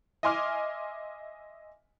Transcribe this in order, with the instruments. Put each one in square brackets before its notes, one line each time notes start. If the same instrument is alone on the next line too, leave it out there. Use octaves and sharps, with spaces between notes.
[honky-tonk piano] D#5 E5 G#5 C6 D6 F6